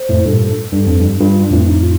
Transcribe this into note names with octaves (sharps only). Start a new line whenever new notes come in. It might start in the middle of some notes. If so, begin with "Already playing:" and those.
Already playing: C5
F2 A2
G2 A#2 A4
G2
F2
G2
G2 F4
F4
F2 A2 D4
D#4
F4